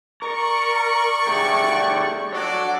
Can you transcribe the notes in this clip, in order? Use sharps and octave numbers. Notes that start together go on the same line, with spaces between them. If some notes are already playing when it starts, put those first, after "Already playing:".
A#4 D5 C#6
A3 G4 G#4
D4 F#4 A4 C#5 D5